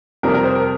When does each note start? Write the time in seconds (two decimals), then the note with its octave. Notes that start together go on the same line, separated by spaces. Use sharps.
0.23 F2 C3 G3 C4 A#4
0.34 A#4
0.44 C5
0.55 A#4